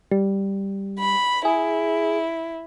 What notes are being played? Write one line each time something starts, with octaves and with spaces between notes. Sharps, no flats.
G3
B5
E4 G#4